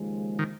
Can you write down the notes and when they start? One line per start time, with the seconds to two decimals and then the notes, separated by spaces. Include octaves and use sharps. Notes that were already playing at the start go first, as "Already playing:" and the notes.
Already playing: D#2 C#3 F3 G#3
0.39 D#3